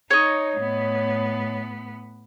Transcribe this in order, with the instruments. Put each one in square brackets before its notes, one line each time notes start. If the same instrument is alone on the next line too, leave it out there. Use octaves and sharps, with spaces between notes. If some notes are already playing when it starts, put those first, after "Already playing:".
[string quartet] D#4 [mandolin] C#5 D#5
[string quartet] A2 B3